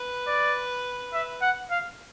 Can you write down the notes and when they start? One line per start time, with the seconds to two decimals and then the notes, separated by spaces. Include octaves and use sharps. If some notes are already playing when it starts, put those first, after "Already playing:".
Already playing: B4
0.27 D5
1.13 E5
1.42 F#5
1.71 F5